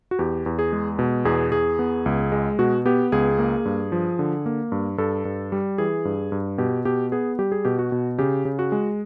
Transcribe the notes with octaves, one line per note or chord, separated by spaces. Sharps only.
F#4
E2 G4
E2
G#4
G#3
B2
E2 G#4
E2 G#4
B3
C#2
G#3
B2 F#4
B3 G4
C#2 G#4
A#3
G2
F3
D3
A#3
G2
G2 A4
G2
G3
E3 G#4
G2
G2
B2 G4
B2 G4
B3 G#4
G3 G4
G#4
B2 G4
F#4
B2
C#3 G4
C#3
F#4
G#3